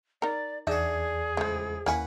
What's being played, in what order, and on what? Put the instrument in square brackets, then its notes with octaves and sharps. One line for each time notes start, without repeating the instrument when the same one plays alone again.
[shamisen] D#4 A#4 [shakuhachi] D5
[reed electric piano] E2 [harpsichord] D4 F#4 [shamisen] D#4 D#5 E5 [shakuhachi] G#4
[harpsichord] C#2 A2 [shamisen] F3 C5
[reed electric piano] D#2 [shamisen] A#3 E4 G#5 [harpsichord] C#4 B4 F#5